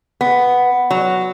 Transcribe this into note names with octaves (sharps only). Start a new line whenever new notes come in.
B3
F#3